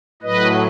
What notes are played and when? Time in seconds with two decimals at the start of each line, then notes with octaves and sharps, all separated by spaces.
0.22 A2 F#3 B4 D#5